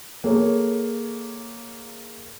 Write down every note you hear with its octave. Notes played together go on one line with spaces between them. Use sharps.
A#3 G#4 A4 C#5